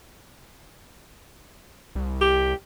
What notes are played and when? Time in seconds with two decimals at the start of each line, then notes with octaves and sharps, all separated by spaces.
1.95 C2
2.21 G4